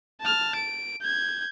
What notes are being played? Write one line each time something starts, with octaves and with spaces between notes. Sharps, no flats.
A5 F6
D7
G6 G#6